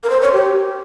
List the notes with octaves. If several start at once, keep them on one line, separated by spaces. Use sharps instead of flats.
A#4
C5
C#5
G4